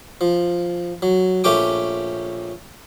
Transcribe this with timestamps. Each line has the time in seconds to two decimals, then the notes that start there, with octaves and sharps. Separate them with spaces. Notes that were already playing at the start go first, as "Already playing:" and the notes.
0.21 F3
1.02 F#3
1.44 A#1 A3 C#4 G4 G5 D6